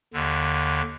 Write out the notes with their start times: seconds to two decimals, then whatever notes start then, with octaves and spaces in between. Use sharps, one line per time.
0.14 D#2 D3